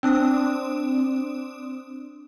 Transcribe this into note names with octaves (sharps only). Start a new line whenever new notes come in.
C4 D4 D#6